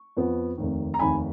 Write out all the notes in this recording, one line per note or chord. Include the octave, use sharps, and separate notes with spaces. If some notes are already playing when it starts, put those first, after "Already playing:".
Already playing: C#6
F2 F3 B3
F1 D#2 D#3
A#5
F1 D#2 D#3 G#5 B5